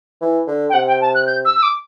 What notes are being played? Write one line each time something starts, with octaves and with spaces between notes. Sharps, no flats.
E3
D3
G5
C3 F#5
G5
A5
F#6
G6
E6
E6
D6